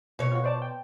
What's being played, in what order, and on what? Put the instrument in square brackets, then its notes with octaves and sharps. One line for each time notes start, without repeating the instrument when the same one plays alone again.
[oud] B2 C#5
[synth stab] F4 F#4
C5 D5 A5
G5